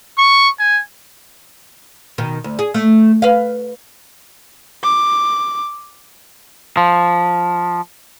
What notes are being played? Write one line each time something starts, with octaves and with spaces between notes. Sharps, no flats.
C#6
G#5
B2 D#3
D2
G#4
A3
B4 F5
D6
F3